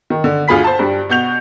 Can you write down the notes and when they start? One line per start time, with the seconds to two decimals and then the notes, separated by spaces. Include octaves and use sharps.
0.10 D#3
0.24 D3
0.48 D2 F4 G#4 B5 B6
0.64 C5 A5
0.79 G2 G3
1.09 B2 F#4 G6 F7